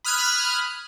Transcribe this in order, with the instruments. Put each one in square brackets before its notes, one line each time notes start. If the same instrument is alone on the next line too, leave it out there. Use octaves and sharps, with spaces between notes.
[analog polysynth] B5 D#6 F6 F#6 G#6